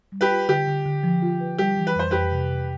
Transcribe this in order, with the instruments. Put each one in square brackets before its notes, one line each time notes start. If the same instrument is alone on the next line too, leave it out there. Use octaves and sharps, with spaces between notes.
[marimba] G3
[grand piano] G4 B4
[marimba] F4
[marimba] D3 [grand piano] G4
[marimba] D3
D3
F3
F4
B4
[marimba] G3 [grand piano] G4
[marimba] E3
[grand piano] B4
[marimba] F2 [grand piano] C5
[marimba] F2 [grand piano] G4 B4
[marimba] C3
C3